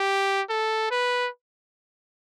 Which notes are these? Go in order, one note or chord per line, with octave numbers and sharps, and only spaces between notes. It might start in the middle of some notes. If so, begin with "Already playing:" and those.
Already playing: G4
A4
B4